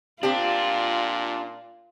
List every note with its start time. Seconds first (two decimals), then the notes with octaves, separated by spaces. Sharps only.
0.23 A#2 C4 D4 F4 G4